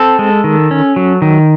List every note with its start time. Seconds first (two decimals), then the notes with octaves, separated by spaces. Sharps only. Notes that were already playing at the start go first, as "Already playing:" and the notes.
Already playing: C4 A4
0.19 G#3
0.44 D#3
0.71 C#4
0.96 F#3
1.22 D#3